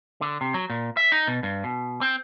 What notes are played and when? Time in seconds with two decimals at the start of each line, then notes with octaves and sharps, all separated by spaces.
0.21 D3
0.41 C3
0.54 F#3
0.70 A#2
0.97 E5
1.12 D#4
1.27 B2
1.43 G2
1.64 B2
2.01 C4